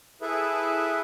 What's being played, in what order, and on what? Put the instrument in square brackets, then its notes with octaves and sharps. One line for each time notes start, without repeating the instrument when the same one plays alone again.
[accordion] E4 G#4 A4 B4 E5